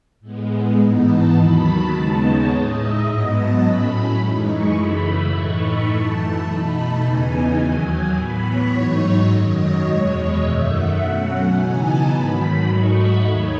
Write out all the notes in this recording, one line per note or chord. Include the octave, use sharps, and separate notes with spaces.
A2 G#3 B3
G#2 E3 B3 D#4
A5
D#2 D#3 F#3 B5
A5
D#2 C#3 G#3 B3 D#4
C#5
A2 G#3 D#4 D#5
E5
G#2 F#3 B3 D#5
A5
A2 F#3 A3 C#4 B5
F#2 E3 G#3 D#4
C#6
F#2 C#3 E3 A3 B5
B5
A2 E3 A3 D#4 C#6
B5
F#2 E3 A3 A5
B2 A3 D#4 B5
A5
E2 C#3 E3 B3 D#4 G#5
D#2 D#3 F#3
A2 E3 B3 B5
C#5
G#2 F#3 A3 D#4
F#2 D#3 F#3 D#5
C#5
E2 B2 G#3
D#5
F#2 D#3 A3 E5
F#5
B2 F#3 A3 C#4
C#3 E3 B3 D#4 G#5
A5
G#2 D#3 F#3 B5
G#2 F#3 A3 D#4 C#6
B5
D#2 D#3 A3 D#4 C#5